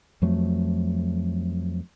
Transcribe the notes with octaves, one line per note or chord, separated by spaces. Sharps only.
F2 F3 F#3 A3